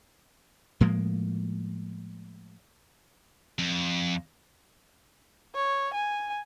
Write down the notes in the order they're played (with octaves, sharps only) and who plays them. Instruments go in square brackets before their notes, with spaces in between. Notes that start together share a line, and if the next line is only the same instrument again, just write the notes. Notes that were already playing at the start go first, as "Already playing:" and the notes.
[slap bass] A2 F3 G#3 A#3
[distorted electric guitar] F2
[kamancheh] C#5
G#5